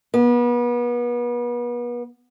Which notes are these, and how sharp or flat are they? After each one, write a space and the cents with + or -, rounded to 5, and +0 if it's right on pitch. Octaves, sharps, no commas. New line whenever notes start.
B3 -35